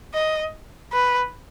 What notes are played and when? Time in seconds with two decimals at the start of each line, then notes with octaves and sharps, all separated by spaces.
0.14 D#5
0.93 B4